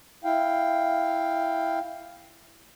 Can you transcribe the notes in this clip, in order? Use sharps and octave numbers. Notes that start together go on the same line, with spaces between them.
E4 F5 G5